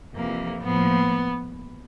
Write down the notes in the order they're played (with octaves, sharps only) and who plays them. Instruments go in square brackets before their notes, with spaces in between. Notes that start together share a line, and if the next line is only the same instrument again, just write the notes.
[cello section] F2 C3 E3 [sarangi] A#3
[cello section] A2 F3 A#3 [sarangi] B3